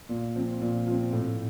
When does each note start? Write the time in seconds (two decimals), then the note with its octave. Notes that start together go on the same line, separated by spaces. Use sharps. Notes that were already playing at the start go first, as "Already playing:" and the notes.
0.09 A#2
0.35 F3 C4
0.62 A#2
0.87 F3 C4
1.13 A2